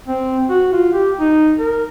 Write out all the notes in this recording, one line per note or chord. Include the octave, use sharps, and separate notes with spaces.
C4
F#4
F4
G4
D#4
A#4